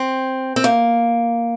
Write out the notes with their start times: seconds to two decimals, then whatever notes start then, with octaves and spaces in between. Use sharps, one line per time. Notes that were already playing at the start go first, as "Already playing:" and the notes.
Already playing: C4
0.56 C4
0.64 A#3